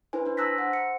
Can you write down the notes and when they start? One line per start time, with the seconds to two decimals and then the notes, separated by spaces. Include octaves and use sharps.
0.13 D4 E4 B4 C5 G#5
0.25 D4 C5
0.37 A5 A#5 E6 F#6 A#6 B6
0.58 C5 F#5
0.73 C#7